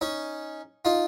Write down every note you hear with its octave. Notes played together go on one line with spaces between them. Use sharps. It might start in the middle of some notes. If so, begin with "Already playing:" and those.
C#4 D#4
D#4 F4